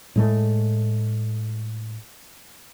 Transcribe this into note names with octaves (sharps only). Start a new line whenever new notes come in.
A2 G#3 A3